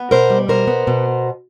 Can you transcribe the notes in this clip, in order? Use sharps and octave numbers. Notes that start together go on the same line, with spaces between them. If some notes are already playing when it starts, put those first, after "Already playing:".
Already playing: B3
B2 A#4 C5
G3
B2 A#4 C5
B3
B2